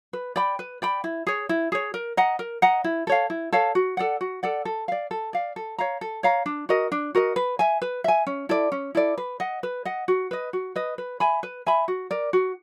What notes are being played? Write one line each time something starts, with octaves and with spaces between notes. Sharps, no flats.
B4
D5 G5 B5
B4
D5 G5 B5
E4
G#4 C#5
E4
G#4 C#5
A#4
D#5 F#5 A#5
A#4
D#5 F#5 A#5
E4
A4 C#5 F5
E4
A4 C#5 F5
F#4
A4 D5 F#5
F#4
A4 D5 F#5
A4
D5 F5
A4
D5 F5
A4
C#5 F5 A#5
A4
C#5 F5 A#5
D4
F#4 A#4 D#5
D4
F#4 A#4 D#5
B4
E5 G#5
B4
E5 G#5
C#4
E4 A4 D5
C#4
E4 A4 D5
B4
D#5 F#5
B4
D#5 F#5
F#4
B4 D#5
F#4
B4 D#5
B4
E5 G#5 B5
B4
E5 G#5 B5
F#4
A#4 D5
F#4